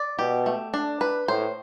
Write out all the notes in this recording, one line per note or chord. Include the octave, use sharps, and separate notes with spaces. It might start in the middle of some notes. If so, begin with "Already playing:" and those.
Already playing: D5
B2 G4
A3
D4
B4
A2 C5